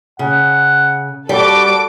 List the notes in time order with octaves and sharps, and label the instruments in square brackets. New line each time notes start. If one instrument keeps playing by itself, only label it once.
[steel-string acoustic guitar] C#3 [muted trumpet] F#5
[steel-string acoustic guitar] G3 [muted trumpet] F#4 [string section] A4 D6